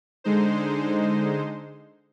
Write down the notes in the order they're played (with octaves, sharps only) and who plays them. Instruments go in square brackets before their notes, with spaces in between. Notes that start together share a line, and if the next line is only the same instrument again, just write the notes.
[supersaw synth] D3 G#3 D#4 C5